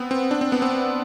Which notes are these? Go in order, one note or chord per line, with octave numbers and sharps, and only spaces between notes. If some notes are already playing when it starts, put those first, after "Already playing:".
Already playing: B3 C4
C4
D4
C4
B3
C4